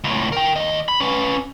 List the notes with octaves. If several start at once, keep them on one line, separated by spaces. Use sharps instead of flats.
C#2 A2
A#4 G5
D#2 D#5
B5
C#4 B4